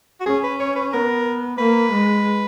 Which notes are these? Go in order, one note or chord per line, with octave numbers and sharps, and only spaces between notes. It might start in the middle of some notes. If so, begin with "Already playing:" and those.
F#4
C#4 G#4
B4
C#5
B4
B3 A#4
A#3 B4
G#3